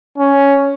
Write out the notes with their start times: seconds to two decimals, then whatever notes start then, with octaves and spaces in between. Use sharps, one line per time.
0.18 C#4